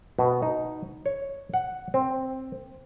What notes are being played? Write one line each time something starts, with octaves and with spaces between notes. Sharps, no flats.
B2
D#4
C#5
F#5
C4